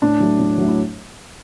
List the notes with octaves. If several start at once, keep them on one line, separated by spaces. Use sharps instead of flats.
A2 D4
F#3 A3
A2
F#3 A3
E4